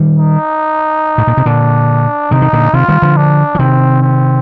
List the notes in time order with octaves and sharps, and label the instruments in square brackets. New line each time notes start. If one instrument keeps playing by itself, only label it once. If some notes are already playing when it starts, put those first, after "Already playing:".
Already playing: [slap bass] D#3 G3
[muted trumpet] D#4
[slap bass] A2
A#2
C3
[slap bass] A#2 D3 [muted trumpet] D4
[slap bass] C3 D#3 [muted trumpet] D#4
[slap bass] D#3
A#2 D3
[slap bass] C3 D#3 [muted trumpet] F4
[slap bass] D#3 G3
D3 F3
[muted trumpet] D4
[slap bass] F3
[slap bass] C3 D#3 [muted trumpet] C4
[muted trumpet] C4